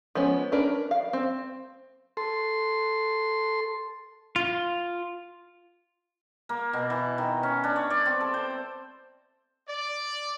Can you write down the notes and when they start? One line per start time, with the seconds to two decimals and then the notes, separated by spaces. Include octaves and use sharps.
0.15 F3 G#3 B3 C#4
0.52 C#4 D4 A#4 B4
0.91 F5
1.13 C4
2.17 A4 C6
4.36 F4
6.49 A#3
6.73 B2
6.90 E3
7.18 D#3
7.43 C#4
7.64 D4
7.76 C#5
7.90 D5
8.06 C4
8.21 A4
8.34 C5
9.68 D5